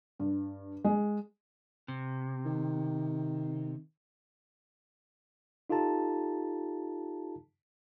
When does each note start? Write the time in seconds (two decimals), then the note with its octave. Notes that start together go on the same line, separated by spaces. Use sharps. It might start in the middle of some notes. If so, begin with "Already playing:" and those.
0.19 G2
0.84 G#3
1.88 C3
2.46 D#3
5.70 D#4 F4 G4 A4 A5 A#5